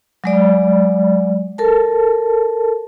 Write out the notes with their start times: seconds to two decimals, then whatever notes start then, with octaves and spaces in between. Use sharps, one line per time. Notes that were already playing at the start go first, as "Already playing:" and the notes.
0.24 F#3 G#3 D5
1.58 A4 A#4 A5